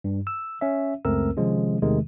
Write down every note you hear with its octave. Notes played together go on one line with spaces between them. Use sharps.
G2
E6
C#4 E5
C#2 F#2 A3 C4 A#4 E6
C3 D#3 F3 G#3 C#4
E2 C3 D#3 G#3 A3